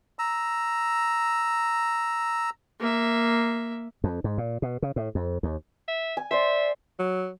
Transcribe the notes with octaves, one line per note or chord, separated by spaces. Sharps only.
A#5 E6
A#3 E5
F2
G#2
A#2
B2
C#3
A2
F2
D#2
E5
G#5
C5 D5 E5
F#3